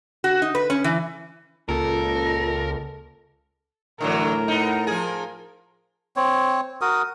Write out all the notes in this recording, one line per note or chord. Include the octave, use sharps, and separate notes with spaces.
F#4
D#4
B4
C#4
E3
C#2 A#2 A4 A#4
A2 D3 E3 F#3 A#4
B3 D#4
F3 G#4
C4 C#5
F#4 A#4 D#6